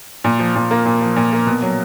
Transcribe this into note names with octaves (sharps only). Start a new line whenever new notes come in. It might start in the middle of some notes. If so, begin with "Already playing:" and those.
A#2
F3
A#2
A#3
A#2
F3
A#2
A#3
B2
F#3